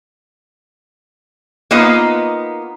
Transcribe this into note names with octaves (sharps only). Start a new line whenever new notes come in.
A#3 B3 D#4 F4 B4 D#5